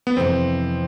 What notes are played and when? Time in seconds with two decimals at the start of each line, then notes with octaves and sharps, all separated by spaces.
0.07 B3
0.16 F2 C3 E3 C4